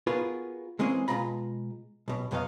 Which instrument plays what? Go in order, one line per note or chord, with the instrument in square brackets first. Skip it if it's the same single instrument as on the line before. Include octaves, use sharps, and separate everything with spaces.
[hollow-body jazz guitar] B3 F4 F#4 G#4 A#4 B4
E3 G#3 A#3 C4 C#4 G#4
B2 G#3 F4 A#5 B5
B1 B2
F2 B2 F#3 B3 D#5 F5